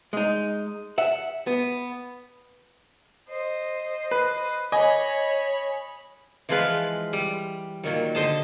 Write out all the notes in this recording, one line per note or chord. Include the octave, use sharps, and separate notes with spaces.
G#3 D#4
E5 F#5
B3
C5 D#5
B4
C#5 D#5 G#5 B5
E3 F3 G#3 F4 B4
G3
A#2 D#3 F#3
D3 C5 D#5 A5